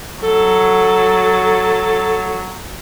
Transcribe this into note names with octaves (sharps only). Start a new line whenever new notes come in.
F#3 A4